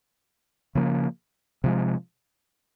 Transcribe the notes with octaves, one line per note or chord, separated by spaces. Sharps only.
C#3 F3 A#3
C3 F3 G#3